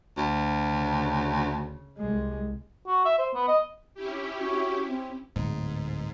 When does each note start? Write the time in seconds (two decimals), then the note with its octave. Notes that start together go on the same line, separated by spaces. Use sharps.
0.17 D2
0.70 C#3
1.98 C2 G#3
2.87 F#4
3.05 E5
3.18 C5
3.34 B3
3.48 D#5
3.94 C#4 E4 G4
4.38 F#4
4.88 C4
5.36 D1 G#2